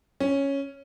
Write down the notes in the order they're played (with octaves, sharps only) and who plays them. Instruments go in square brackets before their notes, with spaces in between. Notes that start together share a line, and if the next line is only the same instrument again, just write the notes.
[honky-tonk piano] C#4